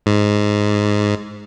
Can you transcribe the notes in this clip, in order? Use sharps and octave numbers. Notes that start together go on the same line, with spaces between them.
G#2